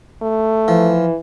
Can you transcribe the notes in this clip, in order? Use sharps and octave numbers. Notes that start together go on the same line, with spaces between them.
A3
E3 F3